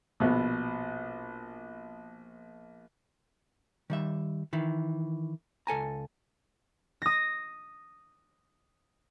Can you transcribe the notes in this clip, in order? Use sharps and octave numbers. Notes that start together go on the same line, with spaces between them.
A#1 B2
D#3 G3 E5
D#3 E3
C#2 A4 G#5 A#5
D#6 A#6